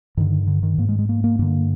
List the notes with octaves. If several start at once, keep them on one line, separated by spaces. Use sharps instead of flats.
G2 D3 D#3
D3
D#3
G#2 A#3
G#3
G#3
A#3
A#3
G2 D3 A#3